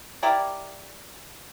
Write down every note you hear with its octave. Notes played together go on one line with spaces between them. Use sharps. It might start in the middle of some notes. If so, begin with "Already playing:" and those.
E4 G4 A#4 D5